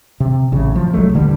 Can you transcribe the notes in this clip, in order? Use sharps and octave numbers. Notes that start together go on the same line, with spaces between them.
C3
A1 C#3
F3
C2 F#3 G#3 A3
D#1 D3 E3 G3